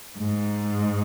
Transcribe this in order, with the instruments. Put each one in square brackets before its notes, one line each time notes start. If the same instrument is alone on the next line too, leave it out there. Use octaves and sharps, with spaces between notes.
[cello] G#2